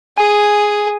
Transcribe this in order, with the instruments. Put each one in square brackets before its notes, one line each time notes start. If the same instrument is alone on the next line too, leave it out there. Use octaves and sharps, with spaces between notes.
[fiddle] G#4 [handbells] G#5